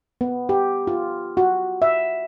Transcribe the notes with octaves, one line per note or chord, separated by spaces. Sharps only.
B3
G4
F4
F#4
E5